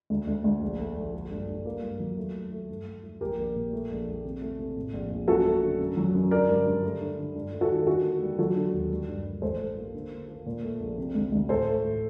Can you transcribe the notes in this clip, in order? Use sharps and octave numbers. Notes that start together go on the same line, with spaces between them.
D2
D2
D2
A#1
A3
A#1
A3
G2
G2
A#3
G2
F#3
A3
A3
A3
G2
A3
A3
A#1 G4 A#4
A#1
A#2
A3
A#1
A#1
C3
A3
C3
A2
A#1
A#1
F#2 F#4 A4
A3
D3
F#2
F#3
F#2
D3 A#4 D5
G2
G2
A3
D3
D3
G2
A3
F#4 A4
D#3
D3 F#4 A4
A#3
G3
F#3 F#4 A4
D3
D#2
G3
G2
G2
A1 A4 C5
G3
A#3
D3
A#3
A#3
A#2
A3
A#1
C3
D2
D2
A2 A4 C5
A3
A2